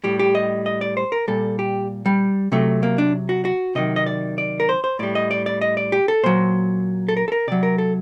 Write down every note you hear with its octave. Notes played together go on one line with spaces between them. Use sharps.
A2 G3 G4
G4
D#5
D#5
D5
C5
A#4
A#2 G3 A4
G4
G3
C3 F#3 A3
A#3
D4
F#4
F#4
C3 D#3 F#3 D#5
D#5
D5
D5
A#4
C5
C5
A2 G3 D5
D#5
D5
D5
D#5
D5
G4
A4
A#2 F#3 C5
A4
A#4
A4
A#4
C3 F#3 D5
A#4
A4